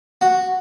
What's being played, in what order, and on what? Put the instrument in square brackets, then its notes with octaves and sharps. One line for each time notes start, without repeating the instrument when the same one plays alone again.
[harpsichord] F#4